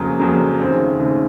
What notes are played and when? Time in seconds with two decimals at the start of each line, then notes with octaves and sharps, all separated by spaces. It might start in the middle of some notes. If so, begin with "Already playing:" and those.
Already playing: F2 C#3 F#3 A#3
0.19 F2 C#3 F#3 A#3
0.60 D#2 C#3 A3 C4
0.99 D#2 C#3 A3 C4